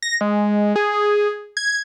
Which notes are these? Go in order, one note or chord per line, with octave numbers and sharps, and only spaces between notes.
A#6
G#3
G#4
G#6